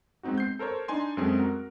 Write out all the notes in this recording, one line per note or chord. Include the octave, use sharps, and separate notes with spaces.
G#3 B3 C4 D#4 F#4
G6 C7
A4 A#4 C5 C#5
D4 D#4 G#5 C6
F#2 G#3 A3 C4 G#4
F#4 A#4